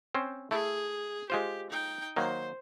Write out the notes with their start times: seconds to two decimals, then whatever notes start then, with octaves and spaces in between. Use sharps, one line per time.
0.15 C4 C#4 C5
0.51 A3 E4 G#4
1.30 G#3 F4 G4 C5
1.71 D#4 G5
2.16 D#3 F#3 A#3 C5